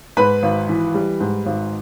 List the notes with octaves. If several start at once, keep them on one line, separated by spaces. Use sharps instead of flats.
G#2 B4 B5
G#1
E3
G3
G#2
G#1